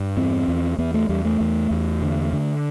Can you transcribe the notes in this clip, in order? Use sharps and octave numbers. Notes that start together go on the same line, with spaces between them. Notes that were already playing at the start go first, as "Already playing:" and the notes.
Already playing: G2
E2 C4
E2
E2 B3
A3
E2 G3
A3
E2
E2
D3
D3